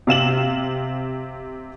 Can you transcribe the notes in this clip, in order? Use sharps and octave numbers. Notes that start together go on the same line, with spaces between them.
C3 F5 E7 F#7